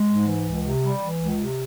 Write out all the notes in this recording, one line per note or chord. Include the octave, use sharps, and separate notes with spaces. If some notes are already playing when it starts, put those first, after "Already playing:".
Already playing: G#3
G#2
E3
C#2
C3
G3
E3
C#2
C3